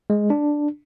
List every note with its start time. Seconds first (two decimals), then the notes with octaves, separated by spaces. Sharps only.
0.10 G#3
0.30 D4